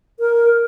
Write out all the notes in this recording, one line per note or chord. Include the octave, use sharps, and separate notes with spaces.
A#4